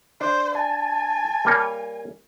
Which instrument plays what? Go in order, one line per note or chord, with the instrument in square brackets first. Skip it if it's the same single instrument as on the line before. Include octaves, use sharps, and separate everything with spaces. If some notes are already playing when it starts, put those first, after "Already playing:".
[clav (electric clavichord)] D4 [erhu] C5
[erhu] G#5 [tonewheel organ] A5
[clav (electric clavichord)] G3 A#3 C#5